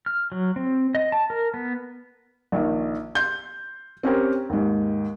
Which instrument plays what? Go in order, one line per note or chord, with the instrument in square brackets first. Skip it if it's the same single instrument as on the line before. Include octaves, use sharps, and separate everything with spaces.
[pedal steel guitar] F6
F#3
C4
D#5
A5
A#4
B3
[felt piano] A#1 D#3
C6 G6
C4 C#4 G4 A#4
D#2 G#2